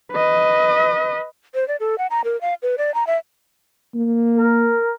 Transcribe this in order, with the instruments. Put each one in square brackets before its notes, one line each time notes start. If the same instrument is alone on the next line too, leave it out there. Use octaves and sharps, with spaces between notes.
[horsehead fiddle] B4 D#5
[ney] C5
D5
A4
F#5
A#5
A#4
F5
B4
D5
A#5
E5
[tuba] A#3
[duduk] A#4